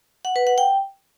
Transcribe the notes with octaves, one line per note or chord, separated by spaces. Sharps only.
F#5
B4
F#5
G5